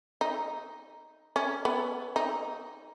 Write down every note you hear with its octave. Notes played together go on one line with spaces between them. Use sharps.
D#4
C#4
B3
D#4